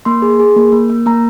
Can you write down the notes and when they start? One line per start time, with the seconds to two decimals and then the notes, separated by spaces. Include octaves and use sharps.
0.05 A#3 C6
0.22 G#4
0.39 G#4
0.56 A#3
0.72 A#3
0.90 A#3
1.06 A#3 A#5